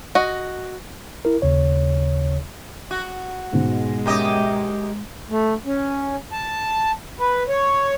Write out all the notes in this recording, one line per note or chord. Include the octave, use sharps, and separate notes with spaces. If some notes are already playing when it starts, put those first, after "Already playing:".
F#4 D#5
E4 A#4
D#2 C#3 C#5
F#4
G#2 B2 G#3
F#2 G4 D#5
A3
C#4
A5
B4
C#5